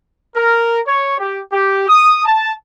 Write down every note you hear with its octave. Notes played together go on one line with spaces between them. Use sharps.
A#4
C#5
G4
G4
D#6
A5